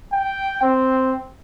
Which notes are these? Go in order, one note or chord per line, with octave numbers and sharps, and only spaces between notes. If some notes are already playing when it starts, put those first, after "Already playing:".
G5
C4